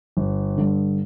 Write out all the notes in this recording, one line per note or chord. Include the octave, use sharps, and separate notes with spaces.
G1
G2 D3